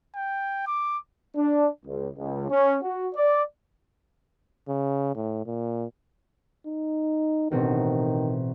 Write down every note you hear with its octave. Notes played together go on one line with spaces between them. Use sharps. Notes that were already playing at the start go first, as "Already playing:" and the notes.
G5
D6
D4
C#2
C#2
C#4
F#4
D5
C#3
A2
A#2
D#4
A1 B2 D#3 C4